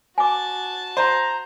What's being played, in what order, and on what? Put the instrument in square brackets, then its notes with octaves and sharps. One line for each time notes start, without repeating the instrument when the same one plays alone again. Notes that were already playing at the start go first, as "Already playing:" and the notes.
[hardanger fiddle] F#4 A5 [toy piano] G#5 D6
[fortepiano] C5 [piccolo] A#5